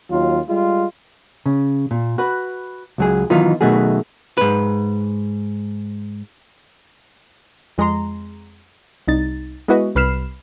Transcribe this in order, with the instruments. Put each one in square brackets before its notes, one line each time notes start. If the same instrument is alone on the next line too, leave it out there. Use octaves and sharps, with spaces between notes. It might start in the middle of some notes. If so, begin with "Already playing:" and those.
[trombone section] D#2 F#3 F4
G3 G#3 F4
[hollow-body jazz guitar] C#3
A#2
F#4 B4
C#2 F#3 G#4
D#3 E3 F#3 B3 D#4 F4
B2 D#3 F#3 A3 F#4 G#4
G#2 B4
[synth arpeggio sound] F2 G#3 G#4 A#5 C6
C2 D#4 A6
G#3 B3 E4 F#4 B4 D#5
C2 B4 B5 F6 C7 E7